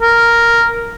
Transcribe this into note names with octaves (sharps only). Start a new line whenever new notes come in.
A#4